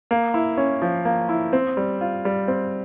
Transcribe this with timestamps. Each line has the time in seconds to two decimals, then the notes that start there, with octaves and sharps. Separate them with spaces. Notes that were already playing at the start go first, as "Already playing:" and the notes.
0.11 A#3
0.34 E4
0.58 C#4
0.82 F3
1.05 A#3
1.29 E4
1.53 C4
1.77 G3
2.01 F4
2.25 G3
2.48 C4